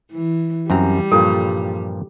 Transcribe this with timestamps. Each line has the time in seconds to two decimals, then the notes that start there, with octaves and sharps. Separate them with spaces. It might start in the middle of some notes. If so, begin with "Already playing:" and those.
0.11 E3
0.70 F#2 G3 C4 A#5
1.12 G2 A#2 F3 A4